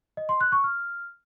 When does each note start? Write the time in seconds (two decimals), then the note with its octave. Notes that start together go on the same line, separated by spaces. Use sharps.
0.17 D#5
0.29 C6
0.41 F#6
0.52 C#6
0.64 F6